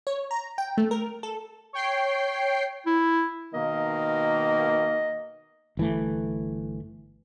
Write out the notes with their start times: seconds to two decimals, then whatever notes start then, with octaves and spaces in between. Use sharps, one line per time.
0.07 C#5
0.31 A#5
0.58 G5
0.77 A3
0.91 A#4
1.23 A4
1.73 C#5 G5 C7
2.86 E4
3.54 B2 D#3 A#3 D#5
5.77 G1 E3 A3